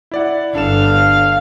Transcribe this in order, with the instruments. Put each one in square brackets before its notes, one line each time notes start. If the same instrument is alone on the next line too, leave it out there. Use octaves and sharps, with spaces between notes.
[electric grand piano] E4 D5 F#5
[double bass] G1 [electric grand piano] D4 A4 E7 [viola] F5